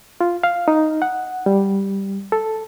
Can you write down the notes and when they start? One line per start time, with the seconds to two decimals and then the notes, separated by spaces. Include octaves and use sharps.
0.21 F4
0.44 F5
0.68 D#4
1.02 F#5
1.46 G3
2.32 A4